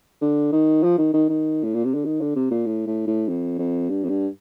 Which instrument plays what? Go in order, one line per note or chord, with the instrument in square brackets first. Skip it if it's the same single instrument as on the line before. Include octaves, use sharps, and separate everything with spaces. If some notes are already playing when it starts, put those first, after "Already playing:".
[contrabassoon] D3
D#3
F3
D#3
D#3
D#3
A2
A#2
C3
D3
D#3
D3
C3
A#2
A2
A2
A2
F2
F2
G2
F2
G2